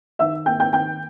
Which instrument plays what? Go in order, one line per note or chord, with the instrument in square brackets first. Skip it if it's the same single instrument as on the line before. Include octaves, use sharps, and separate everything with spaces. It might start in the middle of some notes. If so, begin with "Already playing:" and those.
[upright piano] D#3 E5 E6
A#3 G5 G6
G5 G6
D#3 G5 G6